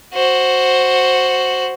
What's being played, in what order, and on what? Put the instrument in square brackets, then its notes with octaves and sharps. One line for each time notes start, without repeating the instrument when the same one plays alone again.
[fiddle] F#4 C5